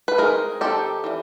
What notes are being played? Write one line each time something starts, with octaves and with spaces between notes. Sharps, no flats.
B4
D#3 G#3 C4 D#4 G#4 A#4
D#3 G#3 C4 D#4 G4 A4
E3 G3